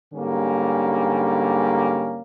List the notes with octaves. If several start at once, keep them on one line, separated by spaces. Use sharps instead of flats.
G#2 D3 G3 A#3 C#4